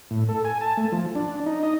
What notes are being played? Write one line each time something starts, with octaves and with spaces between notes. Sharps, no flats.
A2
A4
G#5
A5
A3
F3
D4
D#4
D#5